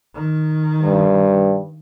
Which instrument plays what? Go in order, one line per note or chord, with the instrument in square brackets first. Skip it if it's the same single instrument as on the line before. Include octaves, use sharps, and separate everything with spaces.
[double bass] D#3
[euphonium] G2